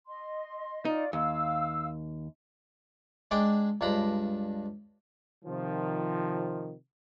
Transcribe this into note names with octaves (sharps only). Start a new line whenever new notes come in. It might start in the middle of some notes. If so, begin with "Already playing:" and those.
D#5 C6
D#4 F4 D5
D#2 F5 E6
G#3 D4 D5 G5
C#2 G2 D4 A#5 B5
C3 D#3 F3